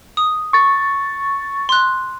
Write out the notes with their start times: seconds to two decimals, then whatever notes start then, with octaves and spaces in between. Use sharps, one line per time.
0.17 D#6
0.53 C#6 A6
1.69 C6 F#6